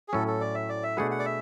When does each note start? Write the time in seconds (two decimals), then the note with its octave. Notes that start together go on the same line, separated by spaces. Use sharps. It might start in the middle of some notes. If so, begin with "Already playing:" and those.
0.08 G#4
0.13 A2 F#3 C#4 A4
0.28 A4
0.41 D5
0.55 E5
0.69 D5
0.83 E5
0.97 B2 A3 D4 G#4 B4 F#5
1.11 F#5
1.19 D5
1.26 E5